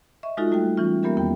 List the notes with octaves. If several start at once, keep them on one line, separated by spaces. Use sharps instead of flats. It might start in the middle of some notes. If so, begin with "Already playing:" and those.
D#5 E5 C#6
G#3 D#4 F4 F#4 A4
G3 A3 F#4 A4 G5
E3 G3 C#4 F4
G3 A#3 B3 G4 A#4 E5
E2 D#3 B3 G5